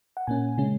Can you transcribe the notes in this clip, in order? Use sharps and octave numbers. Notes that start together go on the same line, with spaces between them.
F#5
A#2 A#3 C#4 G#5
C#3 G#3 C#4